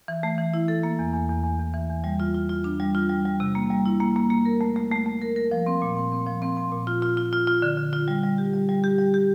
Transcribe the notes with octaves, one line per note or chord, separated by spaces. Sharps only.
E3
A3
E3
E4
A4
A#3
E2
E2
E2
E2
E2
E3
E2
G3
F4
F4
F4
D4
G3
F4
G3
G3
C3
A#3
G3
E4
A#3
A#3
A#3
A#4
A3
A3
A3
A3
A#4
A#4
F3
C4
A#2
C4
C4
F3
C4
C4
A#2
F4
F4
F4
F4
F4
D3
D3
F4
G3
G3
G4
G3
G3
G4
G3
G4